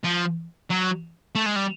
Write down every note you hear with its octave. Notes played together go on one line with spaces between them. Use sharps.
F3
F#3
A3
G#3
G3